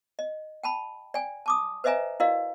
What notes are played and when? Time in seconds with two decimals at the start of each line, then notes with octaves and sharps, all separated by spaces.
0.19 D#5
0.64 G5 A5 B5
1.14 D5 G5 G#5
1.46 A5 D6 D#6
1.84 B4 C5 D#5 E5 G#5 A#5
2.20 E4 F#4 A#4 D5 D#5 F5